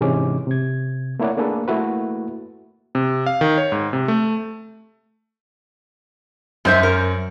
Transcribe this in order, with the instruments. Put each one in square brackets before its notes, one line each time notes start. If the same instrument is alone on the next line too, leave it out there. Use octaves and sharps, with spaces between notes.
[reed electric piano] G#2 C3 E3 G#3 C#4 D6
C3 G#6
A3 A#3 E4 C#5 D5 F#5
A3 A#3 D4 G#4 A4 B4
A3 A#3 E4 F#4 B4
[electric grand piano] C3
F5
D#3
C#5
G#2
C3
A3
[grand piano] F#2 [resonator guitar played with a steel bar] G#3 C5 E5
[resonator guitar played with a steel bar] A#4